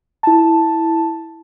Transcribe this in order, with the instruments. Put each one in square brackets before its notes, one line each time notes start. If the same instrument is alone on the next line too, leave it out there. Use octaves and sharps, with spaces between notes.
[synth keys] E4 A5